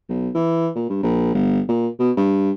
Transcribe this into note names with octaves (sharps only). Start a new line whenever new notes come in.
B1
E3
A#2
G2
A#1
G1
A#2
B2
G2